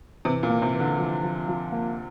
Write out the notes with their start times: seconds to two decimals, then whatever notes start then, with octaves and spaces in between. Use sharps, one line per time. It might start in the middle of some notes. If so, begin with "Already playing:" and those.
0.25 C3 E3
0.43 A#2
0.50 A#3
0.62 C3
0.74 E3
0.80 D3
0.99 F3
1.23 F3
1.48 F3
1.72 A#3